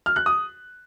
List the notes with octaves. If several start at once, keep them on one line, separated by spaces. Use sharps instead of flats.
F6
F#6
D#6